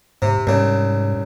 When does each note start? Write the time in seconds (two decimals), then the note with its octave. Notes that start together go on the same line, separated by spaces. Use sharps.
0.22 G#2 C3
0.47 C2 G#2 C#3